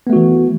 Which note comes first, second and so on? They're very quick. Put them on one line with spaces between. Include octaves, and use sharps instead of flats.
B3 A3 F#4 E3